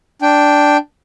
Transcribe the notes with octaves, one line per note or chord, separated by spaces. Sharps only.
D4 G5